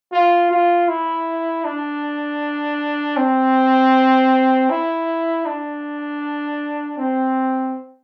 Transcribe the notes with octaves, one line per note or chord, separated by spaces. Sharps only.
F4
F4
E4
D4
C4
E4
D4
C4